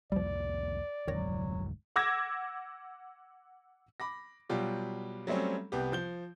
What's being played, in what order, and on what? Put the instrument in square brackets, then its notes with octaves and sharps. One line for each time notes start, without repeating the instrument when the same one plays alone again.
[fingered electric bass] C2 F2 A#3 [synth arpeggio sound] F3 G3 [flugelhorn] D5
[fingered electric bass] F1 D2 G#2 [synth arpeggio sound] D#3 C#5 A#6 [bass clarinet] F#3
[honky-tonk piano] F#5 D6 E6 G#6 A#6
[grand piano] B5 D6 A#6
B2 F#3 G3 F4 G4
F#3 G3 A3 C4 C#4
C2 B3 G4
F3 G6 G7